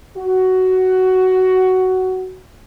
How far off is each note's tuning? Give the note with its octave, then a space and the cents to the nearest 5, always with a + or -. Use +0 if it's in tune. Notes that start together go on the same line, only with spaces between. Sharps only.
F#4 +10